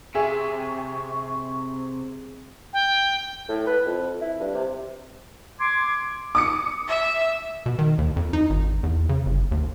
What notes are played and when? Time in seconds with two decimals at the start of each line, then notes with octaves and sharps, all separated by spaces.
0.15 C3 G#4 E5 C#6
2.73 G5
3.49 A2
3.67 B4
3.86 F2
4.21 E4
4.40 G2
4.55 C3
5.60 C6 D6 G#6
6.35 D6 D#6 C#7
6.88 E5
7.66 B2
7.79 D#3
7.98 D#2
8.16 F2
8.33 D#4
8.50 G#1
8.83 E2
9.09 C#3
9.26 G1
9.52 D#2